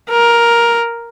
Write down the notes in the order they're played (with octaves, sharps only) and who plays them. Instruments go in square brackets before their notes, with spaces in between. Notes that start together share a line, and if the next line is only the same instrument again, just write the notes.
[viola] A#4